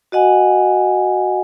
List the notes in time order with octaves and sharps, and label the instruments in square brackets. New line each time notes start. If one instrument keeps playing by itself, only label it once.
[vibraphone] F#4 D#5 F#5 G#5